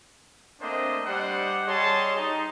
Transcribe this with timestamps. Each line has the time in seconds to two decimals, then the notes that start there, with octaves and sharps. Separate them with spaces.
0.61 A3 A#3 C4 D4 C5 D#5
1.06 G3 D4 G4 C5 D#5 F#5
1.66 G3 G#4 C#5 D#5 A5 C6
2.17 D#4